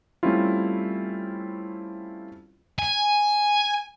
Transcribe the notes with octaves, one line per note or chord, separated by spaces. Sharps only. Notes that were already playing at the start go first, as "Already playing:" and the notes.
G3 A3 C4 C#4 E4 F4
G#5